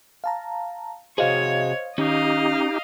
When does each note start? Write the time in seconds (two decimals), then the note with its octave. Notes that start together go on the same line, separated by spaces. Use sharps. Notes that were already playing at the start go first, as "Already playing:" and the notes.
0.24 F5 A5 A#5
1.18 C3 F#4 G#4 C5 C#5 D#5 F5
1.98 D#3 C#4 D#4 G4 D#5 F5